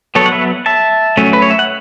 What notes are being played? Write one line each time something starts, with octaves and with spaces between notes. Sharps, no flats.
F#3 B3 A4 C#5
F#5
B4 E5
E5 A5
F#3 A3 C#4
B4
C#5
E5
F#5